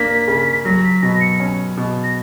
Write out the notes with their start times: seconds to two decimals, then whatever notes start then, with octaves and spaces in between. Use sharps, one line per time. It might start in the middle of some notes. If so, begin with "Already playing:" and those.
Already playing: A#3 D4 B6
0.27 C#3
0.65 F#3 A#6
0.84 B6
1.02 B2 A#6
1.20 C#7
1.40 C#4
1.77 B2
2.03 A#6